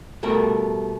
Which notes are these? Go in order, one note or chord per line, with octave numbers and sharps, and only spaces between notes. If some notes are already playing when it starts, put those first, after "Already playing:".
B2 G3 A3 A#4